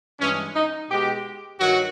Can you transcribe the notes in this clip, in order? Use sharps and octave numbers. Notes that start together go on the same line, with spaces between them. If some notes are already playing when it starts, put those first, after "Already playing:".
G2 E3 G#3 C#4
D#4
B2 G#3 G4
G2 D#3 F#3 F#4